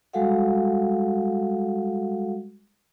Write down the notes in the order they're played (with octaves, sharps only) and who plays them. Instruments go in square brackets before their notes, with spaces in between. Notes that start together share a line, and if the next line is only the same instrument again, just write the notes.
[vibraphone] G3 G#3 F#4 A4 F5 F#5